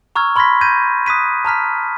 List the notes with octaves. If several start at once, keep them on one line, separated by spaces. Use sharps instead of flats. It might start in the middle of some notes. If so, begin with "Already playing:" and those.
A#5 C#6 E6 F6 G#6
B5 C6 F6 G#6 A#6 B6
G6 G#6 A#6 D#7
D#6 F#6 B6 D#7
A5 A#5 F6 B6